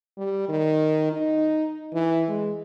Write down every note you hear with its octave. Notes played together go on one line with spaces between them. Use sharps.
G3
D#3
D#4
E3
G#3